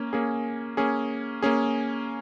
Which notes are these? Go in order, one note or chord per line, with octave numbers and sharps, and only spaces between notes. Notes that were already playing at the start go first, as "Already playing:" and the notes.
Already playing: A#3 C#4
A#3 C#4 G#4
A#3 C#4 G#4
A#3 C#4 G#4